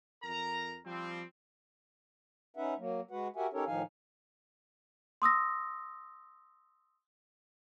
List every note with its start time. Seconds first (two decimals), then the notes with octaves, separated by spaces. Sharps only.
0.23 F2 A#4 A#5
0.86 F3 G3 C4
2.57 C#4 D#4 B4 E5 F#5
2.78 F#3 A#3
3.11 G#3 F#4 B4 F#5
3.36 F#4 G4 A#4 E5 F#5 G#5
3.53 C#4 D#4 G4 A4 A#4 C#5
3.66 A2 D#3 F3 D#4 F5 G#5
5.22 C6 D#6 E6 A#6